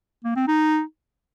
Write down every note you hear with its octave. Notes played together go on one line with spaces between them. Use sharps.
A#3
C4
D#4